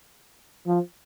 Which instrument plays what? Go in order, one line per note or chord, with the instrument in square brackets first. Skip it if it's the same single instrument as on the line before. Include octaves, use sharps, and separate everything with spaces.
[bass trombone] F3